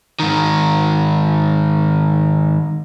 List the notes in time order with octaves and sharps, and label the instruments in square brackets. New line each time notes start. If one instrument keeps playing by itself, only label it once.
[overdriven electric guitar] G#2 D#3